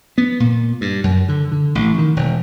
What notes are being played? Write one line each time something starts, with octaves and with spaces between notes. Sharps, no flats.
B3
A#2
G2
F#2
D3
D3
A1
D#3
E1